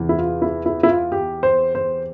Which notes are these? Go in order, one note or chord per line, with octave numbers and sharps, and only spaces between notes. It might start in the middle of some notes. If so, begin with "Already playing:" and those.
Already playing: E2 C3 E3
E4
F4
E4
E4
E4
F4
G4
C5
C5